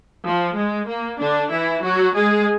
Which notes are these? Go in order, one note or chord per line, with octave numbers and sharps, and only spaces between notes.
F3
G#3
A#3
D3 D4
E3 E4
F#3 F#4
G#3 G#4